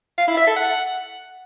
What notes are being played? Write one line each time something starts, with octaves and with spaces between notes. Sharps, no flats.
F5
E4
E5
A4
F#5